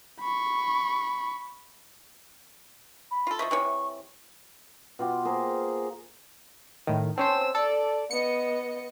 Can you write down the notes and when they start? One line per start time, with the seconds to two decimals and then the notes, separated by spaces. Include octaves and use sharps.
0.21 B5 C#6
3.11 B5
3.27 F4 A4
3.39 F3 D#5 E5 C#6
3.51 C3 E3 C#5
4.99 B2 F4 G4
5.25 A#3 G#4 A#4 C5
6.87 A2 D#3
7.17 C4 C#4 C5 A5 E6
7.55 A4 D5
8.11 B3 D#5 C#7